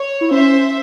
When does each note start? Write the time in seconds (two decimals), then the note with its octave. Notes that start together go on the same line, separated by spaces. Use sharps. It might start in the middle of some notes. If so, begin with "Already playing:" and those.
Already playing: C#5
0.21 E4
0.31 C#4 C5 E5